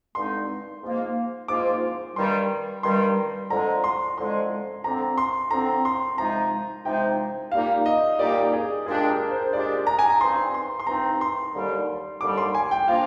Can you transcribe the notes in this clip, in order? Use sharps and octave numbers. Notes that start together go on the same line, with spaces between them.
G2 D3 G#3 C4 D#4 C6
G#2 F3 A#3 F4
G#2 F3 A#3 F4 D6
G2 D#3 G3 C6
G2 D#3 G3 C6
F2 D3 G#3 A#5
C6
F2 D3 G#3 C6
D3 F3 C4 A#5
C6
D3 F3 C4 A#5
C6
C3 F3 G#3 D#4 A#5
C3 F3 G#3 D#4 G5
A#2 G3 A#3 D#4 G4 F5
D#5
A#2 G3 A#3 D#4 G4 D5
G#4
A#2 G#3 D4 G4 G#4
A#4
C5
A#2 G#3 D4 G4 D5
A#5
G#5
A#5
G2 F3 C4 D#4 C6
C6
C6
G2 F3 C4 D#4 A#5
C6
D#2 D3 G3
D#2 D3 G3 D6
C6
G#5
G5
F3 A#3 D4 F4 F5